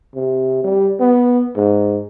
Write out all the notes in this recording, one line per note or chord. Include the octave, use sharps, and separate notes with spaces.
C3
G3
B3
G#2